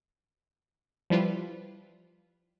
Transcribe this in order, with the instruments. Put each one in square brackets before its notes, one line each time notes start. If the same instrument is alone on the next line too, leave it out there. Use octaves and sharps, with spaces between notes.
[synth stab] F3 G3 E4 F4 B4